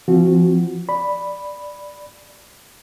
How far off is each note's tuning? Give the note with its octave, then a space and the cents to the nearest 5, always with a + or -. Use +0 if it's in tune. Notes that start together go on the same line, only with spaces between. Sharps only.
F3 -30 C4 -10 F#4 -10
D5 +0 B5 +0